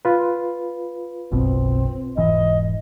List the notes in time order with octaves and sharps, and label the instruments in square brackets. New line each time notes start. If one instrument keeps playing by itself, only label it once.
[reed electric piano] F4 B4
[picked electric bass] F#1 B1 B2 [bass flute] C4
[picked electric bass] E1 G#2 E3 [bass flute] D#5